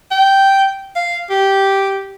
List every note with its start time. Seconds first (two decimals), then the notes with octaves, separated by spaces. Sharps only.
0.11 G5
0.96 F5
1.30 G4